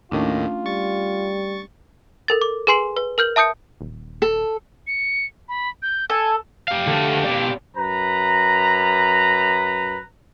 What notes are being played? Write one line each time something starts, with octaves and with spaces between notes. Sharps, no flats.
D#2 A2 D#3 A3 C#4 D4 F4
G3 C#6 A6
A4 A#4 A6
D6
G#4 B4 G#5 C6 C7 F#7
B4
A#4 F6 G6 F#7
E5 A5 D#6 G6 C#7
D#1
A4
C#7
B5
G6
A4 G#5
G4 F5
D3 A3
B2 D5
F#2 B4 A#5